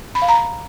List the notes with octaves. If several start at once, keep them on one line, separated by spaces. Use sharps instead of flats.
B5
F5
A#5